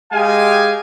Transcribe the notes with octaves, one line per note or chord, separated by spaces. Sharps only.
G#3 G4 D#5 F5 G5 G#5